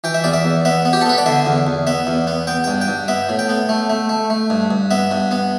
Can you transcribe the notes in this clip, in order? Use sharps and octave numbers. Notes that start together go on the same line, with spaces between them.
E3 G5
E5
E2 D5
E5
E2
B3 E5
B3
G4
A4
B3 B4
D5
D3 E5
E2
E2
B3 E5
E2
B3
B3 G5
G5
G2
G5
G2
B3 E5
A2
G5
B3
A3
A3
A3
A3
G2
G2
B3 E5
G2
B3